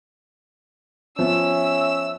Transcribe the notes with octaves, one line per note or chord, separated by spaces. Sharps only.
F3 B3 C#4 E5 E6